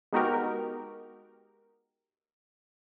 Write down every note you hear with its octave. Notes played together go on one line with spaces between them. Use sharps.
G#3 B3 D#4 F#4 G4 A#4